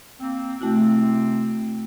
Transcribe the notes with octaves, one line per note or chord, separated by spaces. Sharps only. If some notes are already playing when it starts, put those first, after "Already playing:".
A#3 C4
C3 A3 C4 E4 F#4